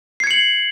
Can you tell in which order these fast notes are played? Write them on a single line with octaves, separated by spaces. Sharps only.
C7 G#6 C#7 F#7